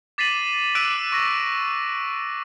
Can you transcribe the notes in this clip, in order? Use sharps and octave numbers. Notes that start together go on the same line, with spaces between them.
D6 A6 B6 C7 D#7 F#7
D6 E6 F#6 B6 D7 D#7
C#6 A#6